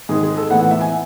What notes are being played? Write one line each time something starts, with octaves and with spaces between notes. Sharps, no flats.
G#2 D#3 G#3 G#4
G#4
A4
A2 E3 B3 F#5
F#5
E5
G#5